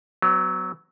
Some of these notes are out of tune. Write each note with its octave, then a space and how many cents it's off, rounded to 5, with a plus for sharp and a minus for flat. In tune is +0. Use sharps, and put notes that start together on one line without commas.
F#3 +10 B3 +40